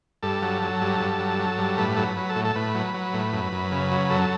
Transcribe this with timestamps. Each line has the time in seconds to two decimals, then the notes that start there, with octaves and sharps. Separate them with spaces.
0.23 G2 A4
0.42 F#3
0.62 F#3
0.81 G2
1.00 G2
1.20 F#3
1.39 F#3
1.58 G2
1.78 A2 B4
1.97 F#3 A4
2.04 B4
2.17 F#3
2.29 A4
2.36 A2
2.45 A4
2.55 A2 B4
2.75 F#3
2.94 F#3
3.14 A2
3.33 F#2
3.52 F#2
3.72 C#3
3.91 F#3
4.10 F#2 A4